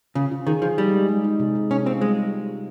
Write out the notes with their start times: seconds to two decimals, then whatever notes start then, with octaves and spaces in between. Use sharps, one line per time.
0.15 C#3 F4
0.31 F4
0.47 D#3 G#4
0.62 F3 G#4
0.78 G3 D#4
0.93 G#3
1.09 G#3
1.24 D#4
1.40 C3
1.55 C3
1.70 C3 C#4
1.86 C4 F4
2.01 G3 G#3
2.17 G3